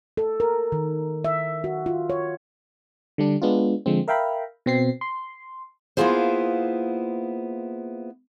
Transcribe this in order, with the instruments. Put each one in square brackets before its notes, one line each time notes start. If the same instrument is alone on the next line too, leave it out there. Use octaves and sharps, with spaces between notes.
[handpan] A4
A#4
D#3
E5
F#4
F4
C#5
[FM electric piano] D3 G3 D4
G#3 B3 D4 F4
D3 F3 G#3 C4
A#4 E5 F5 G5 A#5 B5
B2 C4 C7
C6
[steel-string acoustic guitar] A#3 B3 E4 F4 G#4 C5